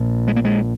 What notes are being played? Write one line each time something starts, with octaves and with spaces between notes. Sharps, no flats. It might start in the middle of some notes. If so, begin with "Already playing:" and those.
Already playing: A#1 A#2
G#3
A#3
G#3